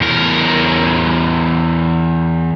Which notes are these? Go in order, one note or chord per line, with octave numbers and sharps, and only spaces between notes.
E2 A#4